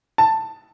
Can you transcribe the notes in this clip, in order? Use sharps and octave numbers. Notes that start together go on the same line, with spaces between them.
A5